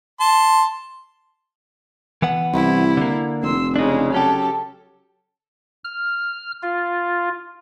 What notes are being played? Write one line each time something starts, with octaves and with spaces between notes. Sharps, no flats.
A5 C6
E3 B3 F#5
C2 E4
D3 A#3
F1 C6 E6
C#3 G#3 D4 D#4
F#3 C#4 G4 A4
F6
F4